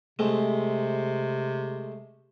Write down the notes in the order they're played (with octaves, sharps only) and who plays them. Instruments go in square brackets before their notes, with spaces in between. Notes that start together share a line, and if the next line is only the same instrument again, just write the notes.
[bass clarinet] C3 [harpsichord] G#3 A3 C4